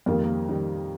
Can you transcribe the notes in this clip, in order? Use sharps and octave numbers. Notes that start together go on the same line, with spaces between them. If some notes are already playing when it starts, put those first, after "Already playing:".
F2 D#3 G3 A#3
A#3
D#3 G3